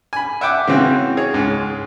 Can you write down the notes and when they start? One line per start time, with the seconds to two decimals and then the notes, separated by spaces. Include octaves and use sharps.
0.13 G#5 B5
0.41 E5 F#5 G5 D6
0.67 C#3 E3 C4 F#4
1.17 G#4 C#5
1.34 C#2 G#2